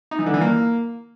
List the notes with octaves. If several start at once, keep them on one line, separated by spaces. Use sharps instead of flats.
D#4
E3
D3
E3
A#3